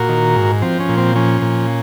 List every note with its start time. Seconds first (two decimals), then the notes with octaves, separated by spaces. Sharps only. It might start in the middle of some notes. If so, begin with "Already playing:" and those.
Already playing: A#2 F#4 A#4
0.09 D#3
0.35 G#2
0.62 F3 C4
0.80 C#4
0.89 A#2
0.98 C4
1.16 F3 C#4
1.42 A#2